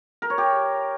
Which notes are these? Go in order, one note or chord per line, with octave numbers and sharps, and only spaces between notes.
A#4
C#5
G4